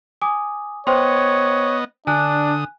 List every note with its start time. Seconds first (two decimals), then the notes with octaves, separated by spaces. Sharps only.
0.22 G#5 D6 D#6
0.87 B3 C5 C#5 D#5 G5 C6
2.07 D3 D4 G#5 D#6 F#6